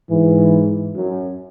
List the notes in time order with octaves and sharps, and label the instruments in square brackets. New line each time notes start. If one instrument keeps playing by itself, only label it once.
[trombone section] G#2 [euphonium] E3
[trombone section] F#2